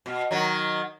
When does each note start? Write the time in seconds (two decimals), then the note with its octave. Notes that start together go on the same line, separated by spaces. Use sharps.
0.06 B2
0.31 D#3 F#3